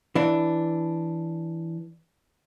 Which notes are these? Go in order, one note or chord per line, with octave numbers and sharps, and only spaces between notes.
E3 D4